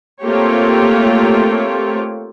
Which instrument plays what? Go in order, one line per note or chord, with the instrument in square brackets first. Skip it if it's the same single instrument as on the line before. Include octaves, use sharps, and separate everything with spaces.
[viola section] A3 A#3 C4 F4 G4 C#5